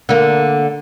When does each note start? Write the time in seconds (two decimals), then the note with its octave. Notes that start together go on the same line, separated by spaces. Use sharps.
0.09 D3 A#3